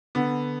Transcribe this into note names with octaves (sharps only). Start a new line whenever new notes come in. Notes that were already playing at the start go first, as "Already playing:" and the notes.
D3 B3